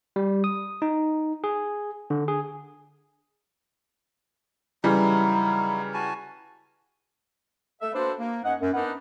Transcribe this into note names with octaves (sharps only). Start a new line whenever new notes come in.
G3
D#6
D#4
G#4
D3
G#4
C#3 E3 F#3 G3 D#4 E4
F#4 G#5 A5
A3 A4 E5
A#3 D4 F#4 A4 B4 C5
A#3
F#2 C#4 D#4 D#5 F#5
F#2
B3 D4 D#4 A#4 B4 F#5